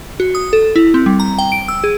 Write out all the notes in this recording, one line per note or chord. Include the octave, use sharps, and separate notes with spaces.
F#4
D#6
A4
E4
C4
G3
A#5
G5
D7
E6
G#4